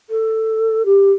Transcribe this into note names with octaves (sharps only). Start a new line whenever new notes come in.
A4
G4